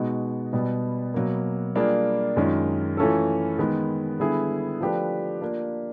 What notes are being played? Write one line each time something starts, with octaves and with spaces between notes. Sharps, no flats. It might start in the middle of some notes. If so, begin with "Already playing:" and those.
Already playing: B2 G#3 B3 D#4 F#4
B2 G3 B3
B2 F#3 A#3
G3 A#3 D4 F4 G#4
F#2 D#3 G#3 C#4 F4
E3 A3 C#4 F4 A4
D#3 G#3 B3
D3 G3 B3 E4 G#4
F3 A3 D4 G4 B4
A#3 D4 F4